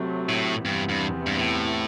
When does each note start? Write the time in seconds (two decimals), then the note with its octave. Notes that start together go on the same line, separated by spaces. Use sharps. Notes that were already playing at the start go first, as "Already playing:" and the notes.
Already playing: C3 F#3 A3
0.29 A2
0.65 E2 G2 C3 E3 B3
0.89 G2
1.27 G2
1.37 A2